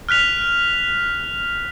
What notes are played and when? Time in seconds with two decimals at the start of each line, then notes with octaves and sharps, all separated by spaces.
0.09 F6 F#6 B6 F7